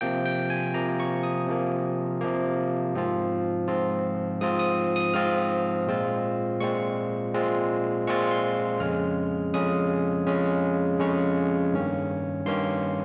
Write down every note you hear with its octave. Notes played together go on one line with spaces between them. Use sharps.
C3 F3 A#3 G5
G5
G#5
C3 F3 A#3 A#5
C#6
D#6
C3 F3 A#3
C3 F3 A#3
G#2 F3 C4 F4
G#2 F3 C4 F4
G#2 F3 C4 F4 D#6
D#6
D#6
G#2 F3 C4 F4 F6
A#2 G#3 C4 F4
A#2 G#3 C4 F4 C#6
A#2 G#3 C4 F4
A#2 G#3 C4 F4 C#6
C6
F2 C#3 G#3 C#4 F6
F2 C#3 G#3 C#4 D#6
F2 C#3 G#3 C#4
F2 C#3 G#3 C#4 C#6
G2 D#3 A#3 C#4
G2 D#3 A#3 C#4 C6